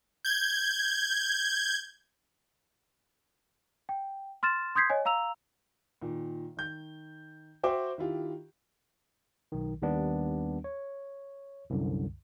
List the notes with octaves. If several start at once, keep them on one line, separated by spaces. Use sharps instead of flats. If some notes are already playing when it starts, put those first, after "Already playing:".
G6 G#6
G5
C6 F6 A6 E7
C6 D#6 G6 G#6 B6 C7
C#5 D#5 G#5
F5 A#5 E6 F7
A#2 D#3
D#3 G6
F#4 C5 E5 G5 D6
D#3 E4 F4 G4
B1 D#3
D#2 D#3 G3 B3 D4
C#5
C2 F#2 D3